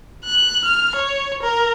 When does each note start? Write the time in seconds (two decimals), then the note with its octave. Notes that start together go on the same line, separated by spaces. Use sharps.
0.24 F#6
0.65 F6
0.96 C#5
1.42 A#4